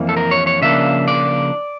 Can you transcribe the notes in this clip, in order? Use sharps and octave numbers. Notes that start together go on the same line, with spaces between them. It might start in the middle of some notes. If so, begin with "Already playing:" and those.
Already playing: F2 E3 A#3
A4
A#4
C#5
C#5
C#3 F3 A#3 D4 E5
D5